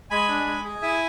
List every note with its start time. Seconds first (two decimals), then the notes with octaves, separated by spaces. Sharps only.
0.10 G#3 G#5 B5
0.28 D4
0.47 G#3
0.64 G#4
0.82 E4 E5 G#5